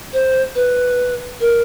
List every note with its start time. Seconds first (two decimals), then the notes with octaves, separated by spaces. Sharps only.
0.13 C5
0.55 B4
1.40 A#4